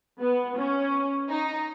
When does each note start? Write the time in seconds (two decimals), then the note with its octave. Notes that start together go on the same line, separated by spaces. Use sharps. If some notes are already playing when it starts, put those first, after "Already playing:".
0.21 B3
0.58 C#4
1.30 D#4